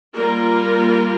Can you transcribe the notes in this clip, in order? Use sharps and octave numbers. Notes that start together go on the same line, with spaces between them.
G3 A#3 F4 A#4